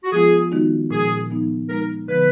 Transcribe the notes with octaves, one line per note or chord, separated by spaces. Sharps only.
F#4
F3 G#3 B3 F4 G#4
D#3 G#3 B3 D#4 F#4
A#2 F3 G#3 G#4
F3 B3 D#4
F3 G#3 D#4 A#4
D3 F3 B3 B4